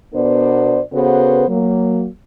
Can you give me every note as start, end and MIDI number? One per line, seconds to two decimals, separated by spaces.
0.14 0.81 47
0.14 0.81 59
0.14 0.81 62
0.14 0.81 70
0.14 0.81 72
0.14 0.81 74
0.94 1.46 49
0.94 1.46 59
0.94 1.46 66
0.94 1.46 69
0.94 1.46 71
0.94 1.46 72
1.48 2.06 54
1.48 2.06 58